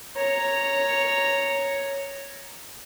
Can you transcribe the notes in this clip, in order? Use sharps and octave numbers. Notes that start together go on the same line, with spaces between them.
C#5 A#5